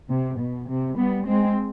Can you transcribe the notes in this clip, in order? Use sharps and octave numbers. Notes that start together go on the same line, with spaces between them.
C3
B2
C3
G3 B3
G#3 C4